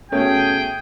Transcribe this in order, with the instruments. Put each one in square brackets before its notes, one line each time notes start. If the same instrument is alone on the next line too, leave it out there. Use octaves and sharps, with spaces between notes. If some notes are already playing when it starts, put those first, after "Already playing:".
[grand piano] B2 A3 C#4 [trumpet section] G#4 G5